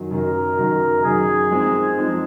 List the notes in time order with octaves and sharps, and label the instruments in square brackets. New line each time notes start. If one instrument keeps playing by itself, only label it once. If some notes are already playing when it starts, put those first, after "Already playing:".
Already playing: [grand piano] F#2 D#3 F#3
[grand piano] F#2 D#3 F#3 [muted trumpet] A#4
[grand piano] F#2 D#3 F#3
[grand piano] F#2 D#3 F#3 [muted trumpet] G#4
[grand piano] F3 G#3 C4 D#4
F3 G#3 C4 D#4